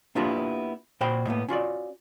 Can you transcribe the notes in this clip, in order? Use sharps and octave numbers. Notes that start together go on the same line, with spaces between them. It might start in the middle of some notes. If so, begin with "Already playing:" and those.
A#3 B3 D4 E4 F4 G4
A#2 F#4 C5 G5 B5
A2 A#3 B3
C#4 F4 F#4 D5